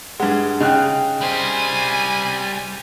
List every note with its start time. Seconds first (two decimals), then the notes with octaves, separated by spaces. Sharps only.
0.20 G2 G#3 F#5
0.60 C#3 D#4 D#5 G5 F#6
1.21 G3 C5 G#5